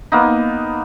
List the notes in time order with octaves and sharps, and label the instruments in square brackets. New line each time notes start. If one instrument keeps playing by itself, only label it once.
[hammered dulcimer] A#3 B3 D#4